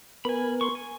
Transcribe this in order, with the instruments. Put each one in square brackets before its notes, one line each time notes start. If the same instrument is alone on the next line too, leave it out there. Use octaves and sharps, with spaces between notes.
[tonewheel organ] B3 A#4 [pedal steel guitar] G#5 B5
[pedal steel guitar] C6 C#6
G#5